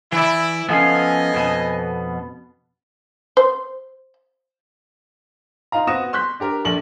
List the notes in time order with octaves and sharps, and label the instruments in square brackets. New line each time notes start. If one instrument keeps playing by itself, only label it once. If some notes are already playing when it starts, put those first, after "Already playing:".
[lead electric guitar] E3 D5 [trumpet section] E4
[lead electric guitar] F3 C#4 [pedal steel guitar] B3 A4 F5 [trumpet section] D#5 G#5
[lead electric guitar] F2 B2
[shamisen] C5
[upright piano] D#4 F4 F5 A#5
B3 C4 F#4 D#6 A#6 E7
C6 C#6 F#6 G6 B6
D4 G4 A#4
A#1 A4 D5 F#7